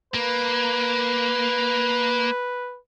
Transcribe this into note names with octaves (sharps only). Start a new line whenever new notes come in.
A#3 B4